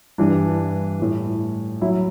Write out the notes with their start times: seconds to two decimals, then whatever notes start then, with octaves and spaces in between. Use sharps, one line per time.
0.18 G2 E3 G3 D4
1.00 A2 G3
1.81 F#3 E4